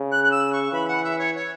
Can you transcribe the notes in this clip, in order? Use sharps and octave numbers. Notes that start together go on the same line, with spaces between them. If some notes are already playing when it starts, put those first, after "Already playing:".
Already playing: C#3
F#6
F#6
E6
C#6
E3 B5
F#5
E5
C#5
C#5